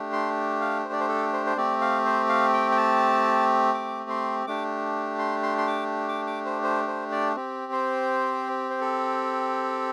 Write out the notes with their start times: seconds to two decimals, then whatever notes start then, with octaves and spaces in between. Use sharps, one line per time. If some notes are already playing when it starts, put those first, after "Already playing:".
Already playing: A3 D4 G4
0.13 C6
0.61 F5
0.85 C5
0.93 D5
1.00 C5
1.09 A4
1.33 C5
1.46 C5
1.57 A3 C4 G4 D5
1.81 F5
2.05 C5
2.29 F5
2.54 G5
2.72 G5
2.77 A5
3.74 D6
4.10 C6
4.47 A3 D4 G4 D6
5.19 C6
5.43 C6
5.58 C6
5.67 D6
6.09 D6
6.27 D6
6.46 C5
6.63 C5
6.88 C5
7.12 D5
7.35 C4 G4
7.72 C5
8.70 C5
8.81 A4